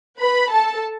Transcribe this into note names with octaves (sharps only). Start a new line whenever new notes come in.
B4 B5
A4 A5